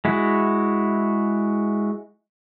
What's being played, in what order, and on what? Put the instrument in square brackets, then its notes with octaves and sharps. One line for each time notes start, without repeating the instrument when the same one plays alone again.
[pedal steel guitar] G#3 E4 F#4